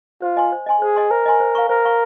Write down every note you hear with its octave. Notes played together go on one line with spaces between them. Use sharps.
F4 C5
D#5 G#5 C6
C5
D#5 G#5 C6
G#4 C5
D#5 G#5 C6
A#4 C5
D#5 G#5 C6
C5
F5 A#5 C#6
A#4 C5
F5 A#5 C#6